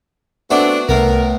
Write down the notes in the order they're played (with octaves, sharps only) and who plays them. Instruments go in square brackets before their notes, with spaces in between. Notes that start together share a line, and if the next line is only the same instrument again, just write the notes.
[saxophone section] A3 C4 D4 [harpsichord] B3 E4 F#4
[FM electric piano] C2 [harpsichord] A2 B3 [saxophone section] A#4